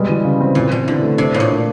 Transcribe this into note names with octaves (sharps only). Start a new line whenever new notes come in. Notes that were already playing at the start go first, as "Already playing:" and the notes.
Already playing: B2 G3 G#3
E3
C#3
C4
A#2 E3
B2 E3
D3 E4
A3
C3 D4
A2 A#3
A#2
D4